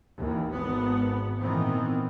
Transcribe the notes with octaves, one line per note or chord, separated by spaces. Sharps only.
D#2 E3
G#1 B3
A#2 D#3 E3 B3 C4